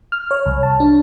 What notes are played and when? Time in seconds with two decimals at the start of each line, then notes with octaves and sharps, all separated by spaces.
0.12 F6
0.31 C#5
0.46 C2
0.63 A5
0.80 D4